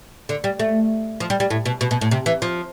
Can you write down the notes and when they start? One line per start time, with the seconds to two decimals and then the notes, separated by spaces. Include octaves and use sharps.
0.29 D3
0.44 G3
0.60 A3
1.20 F3
1.30 G3
1.40 G3
1.50 A2
1.65 B2
1.81 B2
1.91 B2
2.01 A2
2.11 C3
2.26 E3
2.42 F3